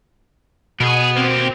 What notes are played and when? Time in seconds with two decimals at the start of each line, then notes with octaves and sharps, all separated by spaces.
0.80 B2 B3 G#4 A#4
1.16 A#3 C4 G4